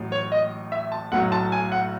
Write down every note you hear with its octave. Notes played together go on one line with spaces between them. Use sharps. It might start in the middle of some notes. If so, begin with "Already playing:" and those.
Already playing: A1 A2 F#3
C#5
D#5
E5
A5
B1 A2 F#3 F#5
A5
G#5
F#5